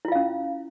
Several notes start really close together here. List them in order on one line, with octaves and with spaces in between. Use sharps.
E4 F4 F5 C#4